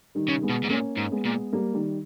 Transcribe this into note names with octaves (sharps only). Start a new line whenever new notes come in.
D#3 G3
C#3
G#3 B3
B2
G#2
A#2 A#3 C#4
G#2
G#3 B3
A#2
G3 A#3
D#3 G3